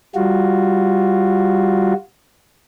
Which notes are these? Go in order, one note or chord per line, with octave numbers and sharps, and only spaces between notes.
G3 F4 F#4